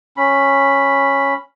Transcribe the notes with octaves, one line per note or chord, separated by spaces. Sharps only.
C#4 B5